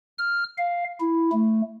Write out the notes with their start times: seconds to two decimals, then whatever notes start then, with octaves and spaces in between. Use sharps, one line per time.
0.18 F6
0.58 F5
1.00 E4
1.32 A3